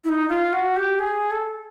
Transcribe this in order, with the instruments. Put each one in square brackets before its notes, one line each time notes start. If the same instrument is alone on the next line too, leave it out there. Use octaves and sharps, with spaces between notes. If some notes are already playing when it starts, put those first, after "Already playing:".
[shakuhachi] E4
D#4
F4
F#4
G4
G#4
A4